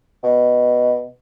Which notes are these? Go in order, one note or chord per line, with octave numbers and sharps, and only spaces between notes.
B2